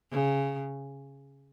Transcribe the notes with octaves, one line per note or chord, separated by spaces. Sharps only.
C#3